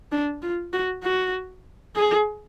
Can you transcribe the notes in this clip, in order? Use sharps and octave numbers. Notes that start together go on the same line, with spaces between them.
D4
F4
F#4
F#4
G#4